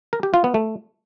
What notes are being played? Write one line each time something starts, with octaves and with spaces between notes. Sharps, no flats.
A#4
G4
F4
B3
A3